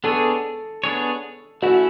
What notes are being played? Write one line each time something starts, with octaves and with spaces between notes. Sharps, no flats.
B3 D4 G#4 A4 C#5
B3 D4 G#4 C#5
A3 C#4 E4 F#4